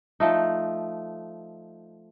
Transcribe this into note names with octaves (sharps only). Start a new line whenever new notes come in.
F3 A3 D#4